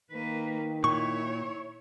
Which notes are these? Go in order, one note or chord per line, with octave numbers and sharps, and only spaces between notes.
D#3 A#3 B4
A#2 E4 C#5 C#6